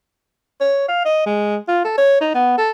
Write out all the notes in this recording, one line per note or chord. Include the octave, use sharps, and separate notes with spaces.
C#5
F5
D#5
G#3
F4
A4
C#5
D#4
B3
A4